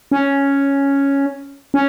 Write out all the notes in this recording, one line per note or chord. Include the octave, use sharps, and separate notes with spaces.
C#4
C#4